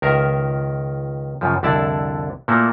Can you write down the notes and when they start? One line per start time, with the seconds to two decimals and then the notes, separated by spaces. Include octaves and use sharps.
0.02 C#2 D#3 A#4 E5 F5
1.41 F#2 C#3 F3
1.63 C2 F2 D3 E4 D5 A5
2.48 A#2 A3 A#3 E4 F#4